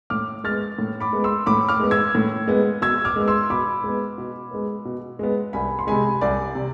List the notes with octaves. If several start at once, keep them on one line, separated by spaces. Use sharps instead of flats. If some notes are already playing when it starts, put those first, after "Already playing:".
A2 D6 F6
G#3 B3 F6 A6
A2
B5 D6
G#3 B3
C6 E6
A2 B5 D6
D6 F6
G#3 B3
E6 G#6
A2
G#3 B3
B2 E6 G#6
D6 F6
G#3 B3
C6 E6
B2 B5 D6
G#3 B3
B2
G#3 B3
B2
G#3 B3
C2 G#5 B5
C6
C3 G#3 G#5 B5
C2 D5
C3